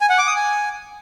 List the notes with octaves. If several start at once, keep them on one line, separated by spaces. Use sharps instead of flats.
G#5
F#5
D6
D#6
G#5